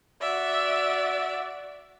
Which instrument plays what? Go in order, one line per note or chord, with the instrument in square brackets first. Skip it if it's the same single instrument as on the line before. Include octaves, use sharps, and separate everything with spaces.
[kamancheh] F#4 D5 [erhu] E5